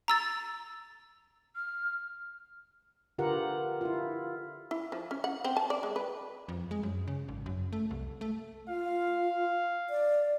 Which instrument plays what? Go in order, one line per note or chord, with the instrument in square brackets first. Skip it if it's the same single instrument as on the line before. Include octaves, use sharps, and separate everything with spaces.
[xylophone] A#5 E6 A6
[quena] F6
[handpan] D3 F4 G4 A#4 B4 F#5
E4 F4
[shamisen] E4
F3
C#4
F#5
C4
A5
D5
G#3
B4
[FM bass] F2
G#3
F#2
C#3
G#1
F#2
A3
C2
A3
[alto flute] F4 [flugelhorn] F5
[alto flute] D5